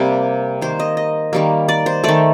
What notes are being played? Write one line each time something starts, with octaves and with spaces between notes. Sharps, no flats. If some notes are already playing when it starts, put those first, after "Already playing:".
Already playing: C3 G3 A#3
D#3 A#3 C5
D#5
D#5
D#3 G3 A#3
D5
C5
D#3 A3 D5